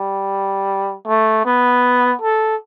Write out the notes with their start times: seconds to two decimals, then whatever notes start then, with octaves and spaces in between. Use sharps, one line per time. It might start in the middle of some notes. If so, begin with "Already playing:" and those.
Already playing: G3
1.07 A3
1.45 B3
2.22 A4